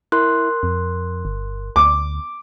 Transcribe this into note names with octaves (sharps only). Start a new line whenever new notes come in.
E4 A#4 C6 F#6
F2
G1
D2 D6